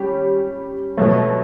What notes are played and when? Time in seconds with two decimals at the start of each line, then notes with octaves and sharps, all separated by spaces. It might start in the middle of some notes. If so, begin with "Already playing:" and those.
Already playing: G3 C#4 G4
0.97 B2 F#3 A3